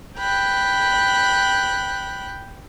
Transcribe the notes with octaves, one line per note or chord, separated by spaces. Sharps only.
G5 B5 F#6